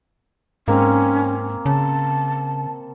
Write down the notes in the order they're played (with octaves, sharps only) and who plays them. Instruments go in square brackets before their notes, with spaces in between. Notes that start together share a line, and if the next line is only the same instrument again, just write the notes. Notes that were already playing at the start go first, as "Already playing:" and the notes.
[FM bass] G#2 [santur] A#3 C4 [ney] C#4
[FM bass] C#3 [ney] A5